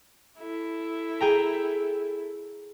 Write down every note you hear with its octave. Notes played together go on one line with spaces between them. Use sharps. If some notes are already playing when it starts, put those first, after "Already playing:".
E4 A4
G#4 G5 A#5